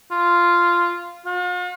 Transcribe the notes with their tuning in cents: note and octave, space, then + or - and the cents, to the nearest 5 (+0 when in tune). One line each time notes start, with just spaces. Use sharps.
F4 -5
F4 +45